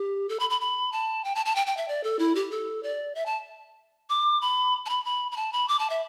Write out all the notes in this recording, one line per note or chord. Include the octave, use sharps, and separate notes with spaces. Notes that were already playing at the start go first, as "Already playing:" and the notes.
Already playing: G4
A4
B5
B5
B5
A5
G5
A5
A5
G5
G5
E5
D5
A4
E4
G4
A4
D5
E5
A5
D6
B5
A5
B5
B5
B5
A5
B5
D6
A5
E5